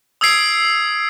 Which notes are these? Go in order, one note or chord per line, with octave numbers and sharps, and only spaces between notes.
D#6 E6 G#6 C7 D7